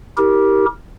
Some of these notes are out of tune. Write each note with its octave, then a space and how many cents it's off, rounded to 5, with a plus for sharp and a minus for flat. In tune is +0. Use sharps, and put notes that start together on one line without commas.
E4 -45 G4 +0 A#4 +0